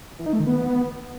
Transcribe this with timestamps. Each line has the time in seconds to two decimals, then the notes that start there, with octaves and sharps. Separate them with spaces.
0.19 E3
0.26 D#4
0.33 A3
0.40 D#3
0.47 B3